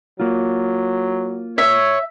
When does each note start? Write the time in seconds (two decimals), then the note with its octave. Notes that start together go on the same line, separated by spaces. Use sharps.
0.20 F#3 A#3 F4
1.58 C#5 E5